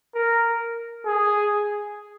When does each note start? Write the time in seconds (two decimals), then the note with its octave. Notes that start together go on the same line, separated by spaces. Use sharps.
0.15 A#4
1.06 G#4